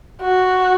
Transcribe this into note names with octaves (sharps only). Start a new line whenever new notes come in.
F#4